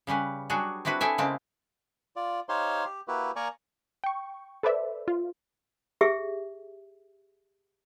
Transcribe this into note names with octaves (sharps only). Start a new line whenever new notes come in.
C#3 G3 C#4 B4
F#3 G3 D4 F#4 G#4
C4 D4 E4 F#4 B4
E4 G#4 A4 E5 G5 G#5
C#3 G#3 A#3 C4 G5 A5
F4 D5
D#4 G4 C5 C#5 F5 C6
G4
A#3 E4 F#4 G4 B4
A#3 A#4 D5 G#5 A#5 C#6
G5 C#6
A4 B4 C5 D5 E5
F4
G4 G#4 E5